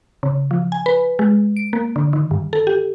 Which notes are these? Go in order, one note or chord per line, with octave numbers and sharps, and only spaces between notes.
C#3
F3
G#5
B4
G#3
D7
A#3
D3
D#3
G2
A4
G4